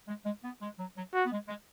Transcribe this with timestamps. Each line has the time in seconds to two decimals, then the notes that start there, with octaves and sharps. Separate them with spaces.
0.08 G#3
0.25 G#3
0.44 B3
0.62 G#3
0.79 F#3
0.97 F#3
1.14 F#4
1.26 B3
1.32 G#3
1.48 G#3